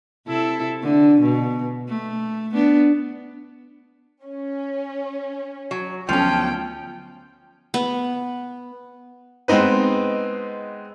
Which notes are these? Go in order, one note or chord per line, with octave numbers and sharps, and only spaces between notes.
C3 E4 A4
D3
B2
A3
B3 D4
C#4
F#3
D2 F3 F#3 B3 C#4 A4 G5
B3
G#3 B3 C4 D#4 B4